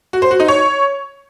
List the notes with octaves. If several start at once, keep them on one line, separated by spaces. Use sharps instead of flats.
F#4
C5
F#4
D#4
C#5